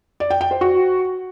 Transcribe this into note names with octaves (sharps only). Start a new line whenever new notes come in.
D5
G5
G5
C5
F#4